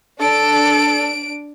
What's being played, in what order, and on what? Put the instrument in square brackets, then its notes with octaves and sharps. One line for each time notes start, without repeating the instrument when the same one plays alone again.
[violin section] D4 D7 [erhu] A4